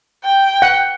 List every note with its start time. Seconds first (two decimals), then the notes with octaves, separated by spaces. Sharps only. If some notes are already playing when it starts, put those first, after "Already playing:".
0.24 G5
0.62 F#5